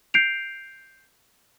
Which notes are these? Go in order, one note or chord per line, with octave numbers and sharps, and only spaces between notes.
G6 C7 D7 F7